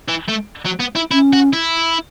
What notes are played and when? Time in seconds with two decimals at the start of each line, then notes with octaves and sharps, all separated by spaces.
0.08 E3
0.29 A3
0.66 F#3
0.80 B3
0.96 E4
1.11 C#4 E4
1.33 F#4
1.53 E4